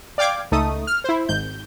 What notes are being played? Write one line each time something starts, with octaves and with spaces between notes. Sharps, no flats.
D5 F5 G5 D6 G#6
C#2 A3 D#4 D#6
F6
E4 C5
G#1 G#2 G6